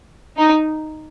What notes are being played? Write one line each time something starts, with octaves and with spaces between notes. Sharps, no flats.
D#4